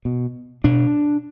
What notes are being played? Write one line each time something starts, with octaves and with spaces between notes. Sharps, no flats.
B2
B2 D4